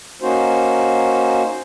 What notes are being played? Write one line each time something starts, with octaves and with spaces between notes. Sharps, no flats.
A#3 C#4 D#4 F#4 C5